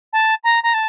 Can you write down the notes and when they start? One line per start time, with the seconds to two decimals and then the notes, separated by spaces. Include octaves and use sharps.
0.13 A5
0.44 A#5
0.63 A#5
0.74 A5